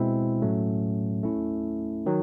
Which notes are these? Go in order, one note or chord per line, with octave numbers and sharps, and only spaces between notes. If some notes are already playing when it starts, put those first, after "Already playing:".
Already playing: B2 G#3 C4 E4
A2 F#3 A3 C#4
A3 C#4 E4
D#3 F#3